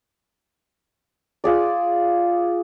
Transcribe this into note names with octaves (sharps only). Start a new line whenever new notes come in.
F4 G#4 D5